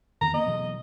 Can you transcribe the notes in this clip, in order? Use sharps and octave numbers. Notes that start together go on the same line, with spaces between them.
E2 D#3 A#5
A#3 B3 D#5
B2 E3 F#3